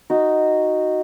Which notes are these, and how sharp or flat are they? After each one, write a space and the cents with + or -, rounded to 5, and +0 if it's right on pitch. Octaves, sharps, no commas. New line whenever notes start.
D#4 +0 F#4 +0